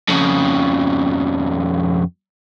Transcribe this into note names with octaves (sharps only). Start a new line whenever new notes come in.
F2 C#3